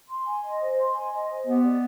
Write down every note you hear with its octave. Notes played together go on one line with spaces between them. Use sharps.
C6
G#5
D#5
C5
C6
G#5
D#5
C5
B3 G4
D5